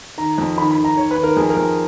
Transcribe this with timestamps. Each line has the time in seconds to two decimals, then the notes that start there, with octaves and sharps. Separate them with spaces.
0.18 D#3 A#5
0.38 F2
0.57 D#3 B5
0.71 B5
0.78 D#3
0.85 A#5
0.97 D#3 C#5
1.11 B4
1.17 D#3
1.23 A#4
1.36 F2 G#4
1.50 A#4
1.56 F2